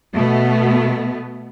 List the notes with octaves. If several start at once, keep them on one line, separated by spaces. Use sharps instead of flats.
B2 A3 B3